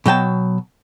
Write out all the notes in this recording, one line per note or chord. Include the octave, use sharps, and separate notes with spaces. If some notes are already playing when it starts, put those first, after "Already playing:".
B2 F#3 G5 A5